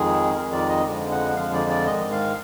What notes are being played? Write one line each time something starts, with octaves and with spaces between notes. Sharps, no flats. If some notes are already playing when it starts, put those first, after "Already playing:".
Already playing: F2 D#3 G#3 G#4
F2 D#3 G#3 A#4
D5
D#5
F2 D3 F3 G#3
F#5
F2 D3 F3 G#3 F5
D5
D5
G#2 D#3 G#3 D#5
F5